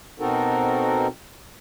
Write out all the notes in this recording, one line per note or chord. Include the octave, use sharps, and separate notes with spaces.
B2 C4 D#4 F#4 A4 A#4